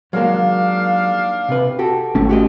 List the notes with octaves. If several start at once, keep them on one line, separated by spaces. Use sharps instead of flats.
D#2 F#3 G#3 A#3 D4 F5
C3 B4
F#4 G4 A4
G#1 A3 C#4
F#4 G4 D#5